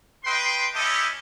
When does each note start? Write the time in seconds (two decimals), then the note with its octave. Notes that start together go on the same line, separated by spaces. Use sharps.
0.24 B4 D#5 G5 C6
0.75 A3 C#4 E4 G4 A4 D#5